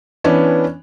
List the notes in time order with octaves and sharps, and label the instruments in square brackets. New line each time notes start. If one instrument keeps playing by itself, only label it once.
[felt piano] E3 B3 C#4 D4